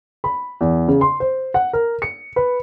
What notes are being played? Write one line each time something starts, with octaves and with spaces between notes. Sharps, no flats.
B5
E2
C#3
C6
C5
F#5
A#4
C#7
B4